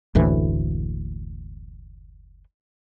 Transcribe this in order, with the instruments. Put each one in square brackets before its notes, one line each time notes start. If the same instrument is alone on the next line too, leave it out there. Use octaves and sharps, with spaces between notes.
[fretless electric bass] F#1 D2 A2 E3